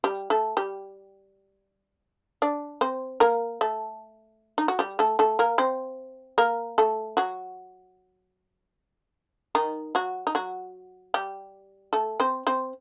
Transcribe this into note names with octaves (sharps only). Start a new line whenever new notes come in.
G3 G4
A3 A4
G3 G4
D4 D5
C4 C5
A#3 A#4
A3 A4
D#4
F#4
G3 G4
A3 A4
A3 A4
A#3 A#4
C4 C5
A#3 A#4
A3 A4
F#3 F#4
D#3 D#4
F#3 F#4
D#4
F#3 F#4
G3 G4
A3 A4
C4 C5
C4 C5